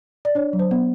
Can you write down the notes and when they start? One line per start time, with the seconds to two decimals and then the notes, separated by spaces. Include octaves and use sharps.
0.25 D5
0.35 D4 C#5
0.53 F#3
0.59 C5
0.71 B3